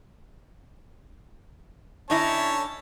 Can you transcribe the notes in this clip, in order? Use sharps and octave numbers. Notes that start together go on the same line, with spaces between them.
D3 C#4 D#4 E4 C#5 A5